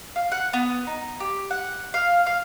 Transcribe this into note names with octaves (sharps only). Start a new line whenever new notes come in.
F5
F#5
B3
D#4
G4
F#5
F5
F5